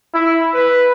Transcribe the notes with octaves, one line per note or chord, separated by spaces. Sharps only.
E4
B4